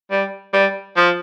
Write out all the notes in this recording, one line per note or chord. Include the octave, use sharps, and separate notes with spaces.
G3
G3
F3